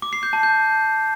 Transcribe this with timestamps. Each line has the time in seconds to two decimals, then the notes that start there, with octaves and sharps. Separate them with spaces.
0.02 D6
0.13 C7
0.23 G6
0.33 A5
0.43 G6